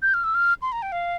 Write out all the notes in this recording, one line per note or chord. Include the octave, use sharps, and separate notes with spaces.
G6
F6
E6
F6
C6
A#5
G5
F5